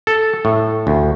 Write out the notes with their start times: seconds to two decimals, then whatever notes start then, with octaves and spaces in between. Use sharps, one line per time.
0.07 A4
0.45 A2
0.87 D2